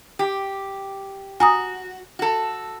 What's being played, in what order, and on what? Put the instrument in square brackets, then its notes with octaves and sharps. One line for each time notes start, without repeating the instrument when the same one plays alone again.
[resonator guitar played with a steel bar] G4
[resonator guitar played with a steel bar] F#4 [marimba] G#5 A#5 D#6
[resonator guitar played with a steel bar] F#4 A4